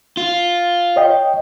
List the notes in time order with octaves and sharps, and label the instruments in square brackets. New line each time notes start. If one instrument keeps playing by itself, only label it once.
[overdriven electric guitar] F4
[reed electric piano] C#5 D#5 G5